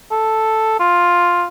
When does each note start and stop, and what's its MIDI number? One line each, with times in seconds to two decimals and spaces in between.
0.11 0.75 69
0.80 1.46 65